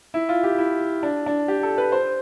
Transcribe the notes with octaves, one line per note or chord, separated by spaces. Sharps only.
E4
F4
G4
E4
D4
D4
G4
A4
B4
C5